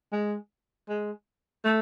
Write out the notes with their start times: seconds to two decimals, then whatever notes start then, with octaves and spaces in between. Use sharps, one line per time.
0.12 G#3
0.89 G#3
1.65 A3